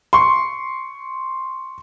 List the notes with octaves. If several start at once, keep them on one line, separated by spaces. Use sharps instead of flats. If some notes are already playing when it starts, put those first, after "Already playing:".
C6 C#6